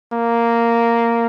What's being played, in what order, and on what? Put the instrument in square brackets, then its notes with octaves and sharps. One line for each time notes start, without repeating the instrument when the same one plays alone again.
[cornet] A#3